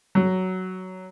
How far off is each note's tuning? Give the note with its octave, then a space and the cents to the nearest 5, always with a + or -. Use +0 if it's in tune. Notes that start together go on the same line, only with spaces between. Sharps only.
F#3 +10